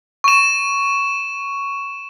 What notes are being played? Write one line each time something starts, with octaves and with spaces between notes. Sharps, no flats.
C#6 E7